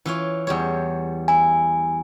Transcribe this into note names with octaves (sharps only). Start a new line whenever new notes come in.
E3 F4 C#5
E2 G3 C#5
E4 G#5